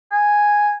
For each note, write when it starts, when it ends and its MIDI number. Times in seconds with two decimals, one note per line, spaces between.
0.12 0.75 80